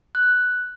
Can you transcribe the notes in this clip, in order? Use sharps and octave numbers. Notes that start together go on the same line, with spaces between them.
F#6